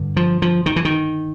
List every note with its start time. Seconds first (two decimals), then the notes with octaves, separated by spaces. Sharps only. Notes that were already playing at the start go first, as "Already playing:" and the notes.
Already playing: G2 D3
0.17 F3
0.42 F3
0.66 D#3
0.76 E3
0.85 D#3